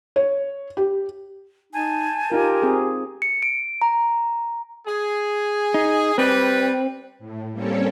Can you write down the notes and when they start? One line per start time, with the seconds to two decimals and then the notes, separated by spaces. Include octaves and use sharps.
0.16 C#5
0.77 G4
1.73 D#4 G#5 A5 G6
2.32 D#4 F4 G4 A#4
2.62 C4 G#4
3.22 C#7
3.42 D7
3.82 A#5
4.87 G#4
5.74 D#4
6.18 G3 C4 B4
7.19 A2
7.52 G3 A#3 C4 C#4 A4 C#5